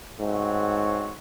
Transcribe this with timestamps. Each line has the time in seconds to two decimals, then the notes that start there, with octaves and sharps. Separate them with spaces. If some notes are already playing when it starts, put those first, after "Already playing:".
0.19 G#2 A3 C4 F#4 C#5 F#5